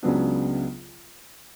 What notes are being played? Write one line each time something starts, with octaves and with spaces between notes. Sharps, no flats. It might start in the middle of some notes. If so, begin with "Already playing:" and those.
C#2 C#3 F#3 B3 D4